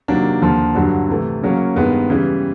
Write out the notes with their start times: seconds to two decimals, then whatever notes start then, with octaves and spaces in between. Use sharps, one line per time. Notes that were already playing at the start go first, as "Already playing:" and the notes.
0.08 C3 D#3 F#3 A#3 D4
0.42 D#2 D3 F3
0.75 G2 D3 F#3
1.09 C3 E3 A3
1.43 C#3 F#3 A#3 C#4
1.76 G2 D#3 G#3 B3
2.10 C#3 E3 G3